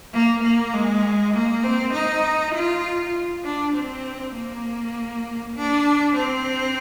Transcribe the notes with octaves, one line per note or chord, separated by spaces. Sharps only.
A#3
A#3
G#3
A#3
C4
D#4
F4
D4
C4
A#3
D4
C4